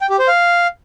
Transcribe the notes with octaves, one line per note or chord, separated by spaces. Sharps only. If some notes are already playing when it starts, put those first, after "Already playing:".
G5
G4
C5
F5